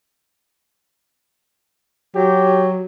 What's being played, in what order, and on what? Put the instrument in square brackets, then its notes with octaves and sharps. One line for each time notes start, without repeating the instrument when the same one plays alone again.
[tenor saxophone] F#3 [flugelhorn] G4